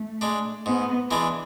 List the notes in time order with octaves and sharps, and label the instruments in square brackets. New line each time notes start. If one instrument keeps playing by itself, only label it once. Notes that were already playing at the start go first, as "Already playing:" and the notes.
Already playing: [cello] A3
[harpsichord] G#3 D4
[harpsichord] G#2 [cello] B3
[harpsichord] E3 G#3 D4